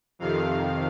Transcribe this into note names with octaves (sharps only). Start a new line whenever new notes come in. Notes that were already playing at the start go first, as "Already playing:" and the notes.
F2 C3 D#3 F5